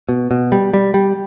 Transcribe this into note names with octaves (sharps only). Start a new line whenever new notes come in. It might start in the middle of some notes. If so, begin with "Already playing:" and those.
B2
B2
G3
G3
G3